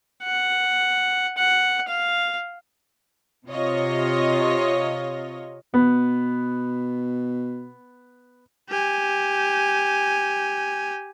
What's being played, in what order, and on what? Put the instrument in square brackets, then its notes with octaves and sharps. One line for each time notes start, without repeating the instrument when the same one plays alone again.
[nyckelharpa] F#5
F#5
F5
[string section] C3 F4 C#5 D#5
[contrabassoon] B2 [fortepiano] B3
[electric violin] G4 G#5